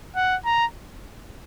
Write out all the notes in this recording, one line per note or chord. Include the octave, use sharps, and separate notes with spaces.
F#5
A#5